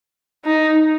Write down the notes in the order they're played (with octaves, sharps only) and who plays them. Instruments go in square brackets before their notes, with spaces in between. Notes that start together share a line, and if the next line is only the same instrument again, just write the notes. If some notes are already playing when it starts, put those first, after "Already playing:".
[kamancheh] D#4